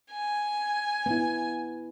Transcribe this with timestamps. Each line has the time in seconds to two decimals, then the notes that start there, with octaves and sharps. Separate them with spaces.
0.13 G#5
1.06 B3 E4